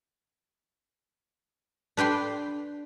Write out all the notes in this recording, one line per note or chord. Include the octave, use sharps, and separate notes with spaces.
D4 B4 G5 C6